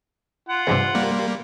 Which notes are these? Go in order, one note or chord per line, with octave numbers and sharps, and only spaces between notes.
F4 F#5
E2 G2 C3
G3 A#3